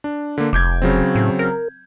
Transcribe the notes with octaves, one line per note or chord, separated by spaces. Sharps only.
D4
D3 A#3
F1 D6 G6 G#6
C#3 F#3 C4
A2
A#4